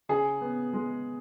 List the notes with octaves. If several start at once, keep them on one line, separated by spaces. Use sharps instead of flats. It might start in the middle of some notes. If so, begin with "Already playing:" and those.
C#3 G#4
B3
G#3